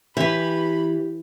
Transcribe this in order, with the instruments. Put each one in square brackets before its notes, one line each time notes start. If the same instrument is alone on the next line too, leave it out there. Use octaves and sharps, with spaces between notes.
[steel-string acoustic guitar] E3 [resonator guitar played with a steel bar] G4 B4 [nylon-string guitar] E5 [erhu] B5